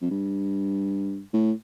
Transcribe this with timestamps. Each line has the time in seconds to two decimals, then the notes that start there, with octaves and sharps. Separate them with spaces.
0.01 F2
0.11 G2
1.34 A2